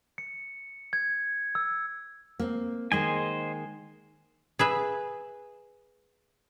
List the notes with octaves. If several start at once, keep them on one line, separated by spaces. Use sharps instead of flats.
C#7
G#6
E6
A#3 C4
D#3 G#3 A#3 C5 D#5 G#5
G#4 B4 E5